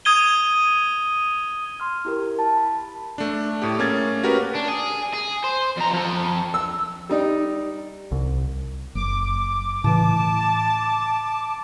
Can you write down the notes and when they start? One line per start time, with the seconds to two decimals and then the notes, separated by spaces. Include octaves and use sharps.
0.05 D#6 G#6 D#7 G7
1.80 C6 F6
2.05 E4 G4 A#4
2.39 A5
2.57 B5
3.18 A3 D4
3.62 A2 G4
3.78 A3 A#3 C#4 G#4 G#6 A6
4.23 C#4 F#4 G4 A#4 B4
4.55 D4
4.68 G#4
5.14 G#4
5.44 C5
5.78 F2 A#5
5.94 F3 A4
6.54 E6
7.09 G3 D#4 D5
8.12 C2
8.95 F#1 D6
9.84 A2 C#3 E3 A5